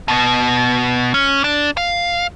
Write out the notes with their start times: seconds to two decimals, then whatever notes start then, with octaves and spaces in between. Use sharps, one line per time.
0.08 B2 B3
1.14 C#4
1.44 D4
1.77 F5